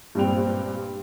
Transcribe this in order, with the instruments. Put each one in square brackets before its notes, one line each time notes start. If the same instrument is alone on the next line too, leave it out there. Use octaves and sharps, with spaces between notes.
[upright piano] G2 A#2 G3 C4 G5 F7